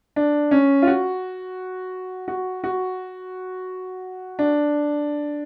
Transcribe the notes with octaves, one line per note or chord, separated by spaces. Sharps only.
D4
C#4
F4
F#4
F#4
F#4
D4